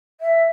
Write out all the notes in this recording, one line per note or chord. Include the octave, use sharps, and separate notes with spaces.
E5